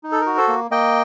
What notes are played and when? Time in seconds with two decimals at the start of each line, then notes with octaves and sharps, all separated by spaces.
0.04 D#4
0.12 A4
0.21 A#4
0.26 F#4
0.37 A4 C5
0.48 A#3
0.71 A#3 D#5 G5